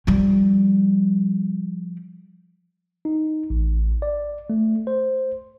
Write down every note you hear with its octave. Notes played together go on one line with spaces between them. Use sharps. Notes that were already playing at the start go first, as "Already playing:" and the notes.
F3 G3
D#4
A1
D5
A3
C5